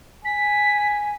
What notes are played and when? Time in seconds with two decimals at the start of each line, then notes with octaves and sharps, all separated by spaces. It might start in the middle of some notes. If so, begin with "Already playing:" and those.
0.25 G#5 B6